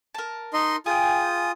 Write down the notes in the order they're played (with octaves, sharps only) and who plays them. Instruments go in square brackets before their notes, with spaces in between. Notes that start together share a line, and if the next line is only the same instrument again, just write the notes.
[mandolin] A#4 A5
[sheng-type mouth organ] D#4 D#5 C6
[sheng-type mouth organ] F4 D#6 [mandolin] G#4 G5